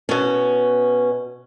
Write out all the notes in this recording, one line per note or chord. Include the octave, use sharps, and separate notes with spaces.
B2 C#4